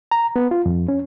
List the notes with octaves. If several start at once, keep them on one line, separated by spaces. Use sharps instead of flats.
A#5
B3
F4
F2
C#4